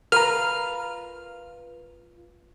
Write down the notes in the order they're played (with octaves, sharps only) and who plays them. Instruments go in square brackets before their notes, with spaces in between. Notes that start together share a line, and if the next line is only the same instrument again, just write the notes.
[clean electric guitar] F4 B4 [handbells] A#4 A#5 [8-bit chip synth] F6